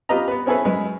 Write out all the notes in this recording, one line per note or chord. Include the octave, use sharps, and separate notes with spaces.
F4 G4 B4 D#5 A#5
B3 B4
C4 C#4 E4 G#4 A4 B4
F#2 G#3 B4